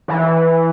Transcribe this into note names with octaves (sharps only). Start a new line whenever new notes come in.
E3